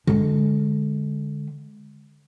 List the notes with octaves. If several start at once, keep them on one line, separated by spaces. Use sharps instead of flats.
D3 G#3